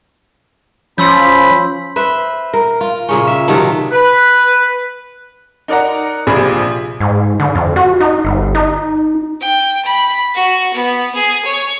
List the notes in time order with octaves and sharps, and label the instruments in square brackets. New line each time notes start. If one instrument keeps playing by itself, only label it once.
[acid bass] F3 [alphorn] C#4 [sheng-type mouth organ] B5 [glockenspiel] C6 E6 G6
[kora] B4 C5 E5
A#4
F4
A#2 C#3 C#4
E5
C3 D#3 F#3 A3
[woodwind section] B4
[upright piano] D#4 A#4 D5 F#5 A#5
A#1 C3 F4 G#4 B5
[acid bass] G#2
D3
F2
F#4
D#4
G1
D#4
[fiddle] G5
B5
F#4
B3
G#4
C#5